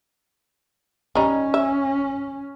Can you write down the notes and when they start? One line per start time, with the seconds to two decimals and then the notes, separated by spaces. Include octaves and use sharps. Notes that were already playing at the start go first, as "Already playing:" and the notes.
1.15 D#3 G3 C#4 D#4
1.54 E5